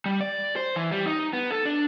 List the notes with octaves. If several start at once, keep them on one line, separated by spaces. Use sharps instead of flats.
G3
D5
C5
E3
G3
D#4
B3
A4
D4